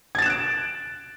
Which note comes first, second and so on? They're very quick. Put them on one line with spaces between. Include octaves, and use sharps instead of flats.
G#6 A6 E7 F#6 D7